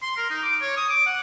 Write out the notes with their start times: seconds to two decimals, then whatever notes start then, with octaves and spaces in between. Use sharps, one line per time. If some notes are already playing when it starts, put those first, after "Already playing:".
0.02 C6
0.17 A#4
0.30 D#4
0.43 D6
0.61 C#5
0.77 D#6
0.90 D6
1.06 F#5